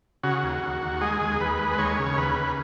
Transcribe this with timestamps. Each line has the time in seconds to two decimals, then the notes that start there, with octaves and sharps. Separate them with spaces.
0.23 C#3 F#4
0.43 D#2
0.63 D#2
0.82 D#2
1.01 G#3 G#4
1.21 D#2
1.40 D#2 B4
1.59 G#3
1.78 D#2 C#5
1.98 C#3
2.17 D#2 B4
2.36 C#3